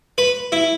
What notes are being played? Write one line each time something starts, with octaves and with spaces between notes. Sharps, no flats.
B4
E4